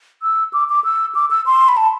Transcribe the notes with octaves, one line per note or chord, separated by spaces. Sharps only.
E6
D6
D6
E6
D6
E6
C6
B5
A5